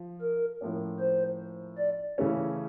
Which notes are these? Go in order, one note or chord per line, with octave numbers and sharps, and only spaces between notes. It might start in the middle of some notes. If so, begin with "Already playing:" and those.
Already playing: F3
A#4
A2 F3 A#3 C#4
C5
D5
C#3 E3 A3 C#4